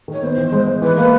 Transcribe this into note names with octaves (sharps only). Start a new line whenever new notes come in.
D#3 C#5
B3 C5
E3
G#3
G#3
E3 B4
A#3 B4